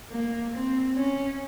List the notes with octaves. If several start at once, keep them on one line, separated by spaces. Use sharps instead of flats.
A#3
C4
C#4